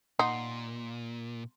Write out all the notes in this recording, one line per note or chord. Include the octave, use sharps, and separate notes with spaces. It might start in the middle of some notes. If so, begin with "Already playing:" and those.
A#2 D#4 F#5 C6